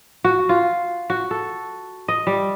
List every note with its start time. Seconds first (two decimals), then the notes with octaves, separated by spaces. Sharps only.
0.24 F#4
0.49 F4
1.10 F#4
1.31 A4
2.08 D#5
2.27 G3